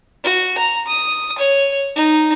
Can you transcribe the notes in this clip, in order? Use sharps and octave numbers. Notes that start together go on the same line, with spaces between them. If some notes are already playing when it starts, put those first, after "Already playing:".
F#4
A#5
D#6
C#5
D#4